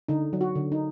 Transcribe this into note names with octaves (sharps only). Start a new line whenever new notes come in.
D3 D#4
F#3
F#4
D3
D#4